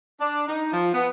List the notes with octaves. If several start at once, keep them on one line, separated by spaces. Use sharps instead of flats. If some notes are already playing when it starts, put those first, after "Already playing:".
D4
D#4
F3
B3